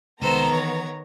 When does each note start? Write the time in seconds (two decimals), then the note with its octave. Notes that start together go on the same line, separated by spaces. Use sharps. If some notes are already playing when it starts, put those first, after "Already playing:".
0.21 C2 D#3 G#3 B3 A4 C5 A#5
0.51 E3 C#5